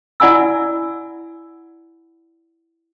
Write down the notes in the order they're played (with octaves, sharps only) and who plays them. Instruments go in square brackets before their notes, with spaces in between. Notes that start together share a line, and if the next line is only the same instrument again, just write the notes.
[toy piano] E4 D5 F#5 G#5 B5 E6